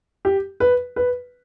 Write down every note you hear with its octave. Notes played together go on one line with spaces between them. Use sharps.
G4
B4
B4